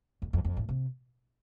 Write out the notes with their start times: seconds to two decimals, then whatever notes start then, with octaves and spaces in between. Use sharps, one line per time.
0.22 F2
0.33 F2
0.45 F2
0.57 A2
0.69 C3